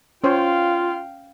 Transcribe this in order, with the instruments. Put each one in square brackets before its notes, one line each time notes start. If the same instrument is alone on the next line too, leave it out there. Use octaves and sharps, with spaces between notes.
[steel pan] C#4 C5 C#5 [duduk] F4 [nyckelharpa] F5 G5